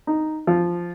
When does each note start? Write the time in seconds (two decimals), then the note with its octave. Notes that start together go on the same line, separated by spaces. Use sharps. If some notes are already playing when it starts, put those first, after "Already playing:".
0.07 D#4
0.47 F3